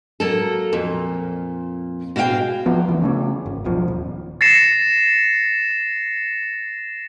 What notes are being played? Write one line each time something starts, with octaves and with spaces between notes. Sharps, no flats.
F#3 A#3 A4
F2 A#2
B2 F#4 G#4 F5 G5
F3 B3
D2 E3
C#3 A3 C#4
G#1
D#1 B1 F3
D#1
A6 A#6 C7 C#7 E7